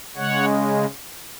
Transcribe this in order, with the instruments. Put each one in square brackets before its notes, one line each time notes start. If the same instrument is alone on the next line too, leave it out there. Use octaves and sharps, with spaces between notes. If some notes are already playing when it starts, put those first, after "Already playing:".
[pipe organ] C#3 G#3 C#5 F#5